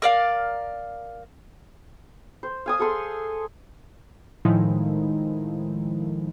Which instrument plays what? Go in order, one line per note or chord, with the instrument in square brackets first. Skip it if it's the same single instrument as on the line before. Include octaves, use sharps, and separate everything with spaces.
[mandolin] A#4 D5 F5
[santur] C5
F5 G#5 D#6
G#4 A4 G#5 C6
[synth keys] A2 D#3 F3 G#3 D#4 E4